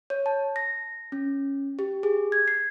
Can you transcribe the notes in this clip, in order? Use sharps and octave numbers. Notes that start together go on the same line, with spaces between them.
C#5
A5
A#6
C#4
G4
G#4
G#6
C7